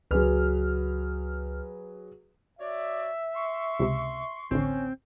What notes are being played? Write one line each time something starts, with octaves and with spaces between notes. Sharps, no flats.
C#2 F#3 G#4 B4 F6
F#4 C#5 D5 E5
C6 C#6
C#2 C3
A1 D2 C4 C#4